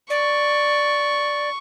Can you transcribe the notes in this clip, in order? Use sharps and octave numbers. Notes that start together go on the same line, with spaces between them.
D5 C#6